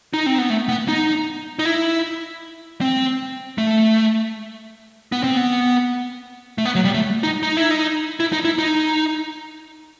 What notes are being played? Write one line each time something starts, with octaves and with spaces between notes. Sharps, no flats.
D#4
C4
B3
A3
B3
D#4
D#4
E4
C4
A3
B3
C4
B3
A3
B3
F#3
G3
A3
D#4
D#4
E4
D#4
E4
D#4
E4
D#4